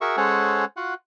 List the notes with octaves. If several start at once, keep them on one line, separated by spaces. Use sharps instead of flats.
F#4 G#4 A#4 E5 C#6
G#3 C#4 A4 C5 C#5 F#5
F4 F#4 F#5